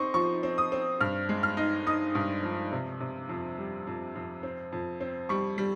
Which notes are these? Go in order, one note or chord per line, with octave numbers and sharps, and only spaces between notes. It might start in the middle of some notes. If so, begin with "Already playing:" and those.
Already playing: C4 D#4 C6 C#6
F3 C#6
C4
D#6
C4
G2 F6
G#3
F6
D#4
D#4 D#6
G2
F3
C3
C3
F2
G3
F2
F2
C4
F2
C4
G3 C#6
G3